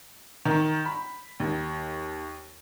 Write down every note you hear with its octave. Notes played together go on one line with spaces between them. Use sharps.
D#3
B5
D#2